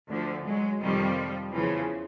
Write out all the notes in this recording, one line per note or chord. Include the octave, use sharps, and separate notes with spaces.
D2 D3 F3
F#3 G#3
F2 C3 D#3 F3 G3
E2 C#3 E3 F3